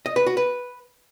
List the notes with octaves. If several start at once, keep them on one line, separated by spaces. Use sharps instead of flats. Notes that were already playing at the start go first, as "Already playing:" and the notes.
D#5
B4
F#4
B4